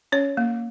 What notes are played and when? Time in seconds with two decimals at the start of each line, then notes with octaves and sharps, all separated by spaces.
0.12 C#4 C#5
0.37 A#3